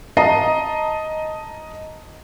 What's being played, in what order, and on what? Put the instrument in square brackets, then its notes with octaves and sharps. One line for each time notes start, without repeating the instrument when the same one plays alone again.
[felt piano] D#5 A5 A#5 C7